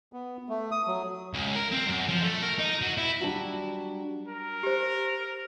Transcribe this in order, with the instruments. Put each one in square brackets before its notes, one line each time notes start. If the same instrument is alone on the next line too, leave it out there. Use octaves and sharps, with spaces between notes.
[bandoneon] B3
A3
D#6
F#3
[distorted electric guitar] C#2
A#4
C4
F#2
F3
A3
A#4
D#4
F#3
E4
[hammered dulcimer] F#3 G3 D4
[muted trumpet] A#4
[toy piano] G4 C5